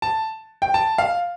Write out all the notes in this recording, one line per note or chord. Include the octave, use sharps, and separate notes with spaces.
A5
G5
A5
F5